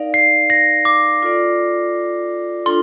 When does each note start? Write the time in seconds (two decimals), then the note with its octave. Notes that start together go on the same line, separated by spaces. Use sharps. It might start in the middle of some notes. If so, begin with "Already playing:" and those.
Already playing: D#4 A#4 D5 F5
0.14 C7
0.50 A#6
0.85 D6
1.22 F4 A4 D5
2.66 D4 F4 A4 C6